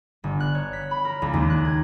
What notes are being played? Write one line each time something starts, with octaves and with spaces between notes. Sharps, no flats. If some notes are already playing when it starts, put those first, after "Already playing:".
G1
F#6
C#5
B6
B5
A#4
C#2
D#2
F#6
G#6